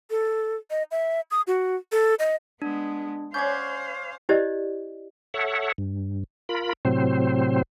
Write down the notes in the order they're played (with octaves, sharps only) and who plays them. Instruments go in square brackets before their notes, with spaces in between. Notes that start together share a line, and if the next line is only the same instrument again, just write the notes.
[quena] A4
D#5
E5
D#6
F#4
A4
D#5
[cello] G#3 B3 [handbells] D4
[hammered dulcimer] C#4 D5 F#5 [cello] C5 F5 [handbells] G6 G#6
[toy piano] E4 G4 C5 D5 D#5
[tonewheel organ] A4 C#5 E5 F#5
G2
F4 A#4 B5
A2 C3 F#3 C4 C5